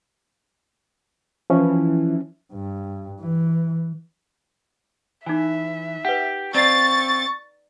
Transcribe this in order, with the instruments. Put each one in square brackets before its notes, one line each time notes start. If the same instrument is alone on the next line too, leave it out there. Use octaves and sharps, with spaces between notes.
[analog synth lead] E3 [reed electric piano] F3 C#4
[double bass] G2
E3
[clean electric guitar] E3 [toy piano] D#4 G#5 [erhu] E5
[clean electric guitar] G4 [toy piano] B4 F#5
[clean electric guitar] C4 F5 [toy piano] D5 A#5 [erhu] C#6 [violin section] A6